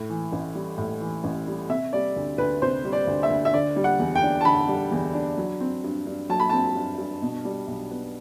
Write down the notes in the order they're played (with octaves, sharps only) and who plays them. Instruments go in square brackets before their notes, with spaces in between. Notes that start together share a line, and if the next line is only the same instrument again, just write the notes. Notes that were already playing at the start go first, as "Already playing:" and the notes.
Already playing: [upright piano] A2
E3
A1
G3
A2
E3
A1
G3
C3 E5
G3 D5
D2
D2 B4
C3 C5
G3
D5
D2
E5
D2
E5
D3 D5
G3
F#5
E2
G5
D4
A5
D3 B5
G3
E2
D4
F#3
C4
G2
G2
F#3 A5
B5
C4 A5
G2
G2
B2
G3
B1
B3